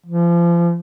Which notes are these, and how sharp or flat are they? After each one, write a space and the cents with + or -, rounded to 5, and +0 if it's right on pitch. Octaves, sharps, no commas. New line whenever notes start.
F3 -35